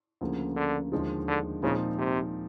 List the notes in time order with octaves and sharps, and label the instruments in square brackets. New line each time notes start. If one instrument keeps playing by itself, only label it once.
[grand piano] D2 C#3 F3 A#3
[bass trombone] D3
[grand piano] D#2 D3 F3 G#3
[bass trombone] D3
[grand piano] A#2 F3 G#3 C4 D#4 [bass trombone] C#3
[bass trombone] C3